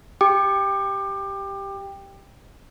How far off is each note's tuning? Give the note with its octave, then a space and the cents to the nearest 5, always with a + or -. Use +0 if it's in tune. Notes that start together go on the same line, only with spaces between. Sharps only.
G4 +0 G5 +15 D6 +25